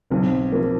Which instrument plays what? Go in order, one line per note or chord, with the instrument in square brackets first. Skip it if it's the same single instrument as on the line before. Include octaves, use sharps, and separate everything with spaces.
[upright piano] B1 [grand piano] C4
[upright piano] F3 [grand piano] A#3